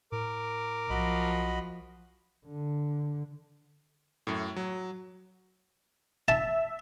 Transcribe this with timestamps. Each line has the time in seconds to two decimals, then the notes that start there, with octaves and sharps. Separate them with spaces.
0.12 A2 A#4 D6
0.90 B1 F3 F#4 D#5 B5
2.47 D3
4.27 F#2 A2
4.56 F#3
6.28 E5 A5